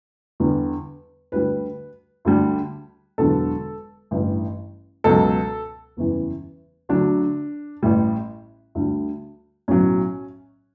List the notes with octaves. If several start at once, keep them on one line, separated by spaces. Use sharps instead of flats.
E2 D3 G3
D2 D3 G3 B4
D2 D3 G3
E1 E2 D3 F#3 A4
A1 G2 E3 G3
C#2 B2 F#3 A4
F#1 E2 C#3 E3 G3
D2 D3 F#3 D4
A1 A2 G3
D2 D3 G3
B1 A2 F#3 C#4